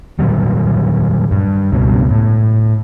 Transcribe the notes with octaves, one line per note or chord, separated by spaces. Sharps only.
A#2 D#3 F#3 G3
G2
C#2 G2 B2
A2